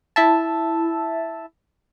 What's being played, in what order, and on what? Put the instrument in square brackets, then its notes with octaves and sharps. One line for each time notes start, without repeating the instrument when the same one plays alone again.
[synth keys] E4 E5 A5